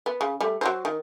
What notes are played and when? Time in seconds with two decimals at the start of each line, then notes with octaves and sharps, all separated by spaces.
0.06 B3
0.21 C#3
0.40 G3 A3
0.61 F#3 F#4 C5
0.85 D#3